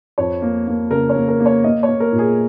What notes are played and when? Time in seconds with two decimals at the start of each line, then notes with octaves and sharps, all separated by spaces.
0.18 F2 C#5
0.42 A#3
0.67 A#3
0.91 C#3 A#4
1.09 C#5
1.16 A#3
1.28 A#4
1.40 A#3
1.46 C#5
1.64 A#3 D#5
1.83 C#5
1.88 A#3
2.00 A#4
2.12 A#2
2.18 G#4